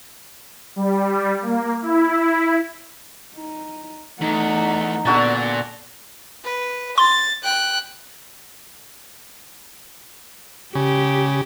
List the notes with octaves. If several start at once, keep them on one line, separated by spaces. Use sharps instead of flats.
G3
A#3
E4
D#4
E2 A3 D#4 F#5
A#2 D3 B3 F#4 D5 A5
B4
C6 A6
G5 F#6
C#3 G4